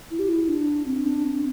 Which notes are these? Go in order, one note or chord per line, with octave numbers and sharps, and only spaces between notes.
E4
G4
E4
D4
C4
D4
C4